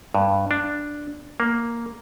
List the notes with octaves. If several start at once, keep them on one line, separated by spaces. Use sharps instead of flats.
G2
D4
A#3